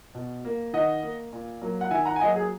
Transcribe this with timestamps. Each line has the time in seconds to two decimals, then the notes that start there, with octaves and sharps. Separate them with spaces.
0.15 B2
0.45 A#3
0.73 D#3 D#5 F#5
1.02 A#3
1.32 A#2
1.62 F#3 A#3
1.81 F#5
1.91 D#3 E5 G#5
2.05 F#5 A#5
2.16 G#5
2.20 F#3 A#3 D#5 F#5
2.36 G#4